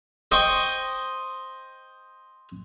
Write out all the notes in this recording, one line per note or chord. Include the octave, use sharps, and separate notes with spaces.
C5 D#5 G5 C#6